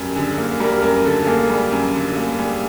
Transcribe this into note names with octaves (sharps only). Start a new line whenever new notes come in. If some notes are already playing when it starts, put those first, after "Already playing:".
Already playing: F#2 G3 A#4
D3 G#4
A#3
G3 A#4
F#2 A#4
D3 A4
A#3 G#4
G3
F#2
D3
A#3
G3 G#4